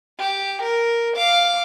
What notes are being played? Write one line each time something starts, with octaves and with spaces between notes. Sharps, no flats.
G4
A#4
F5 D6